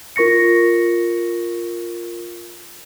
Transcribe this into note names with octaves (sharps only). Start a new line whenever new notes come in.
F4 A#4 C#6 A#6 C#7